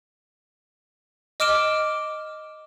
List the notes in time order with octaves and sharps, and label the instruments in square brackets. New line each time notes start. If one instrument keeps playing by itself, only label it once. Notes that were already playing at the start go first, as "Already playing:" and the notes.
[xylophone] D#5 D6 F6 D7 E7 G7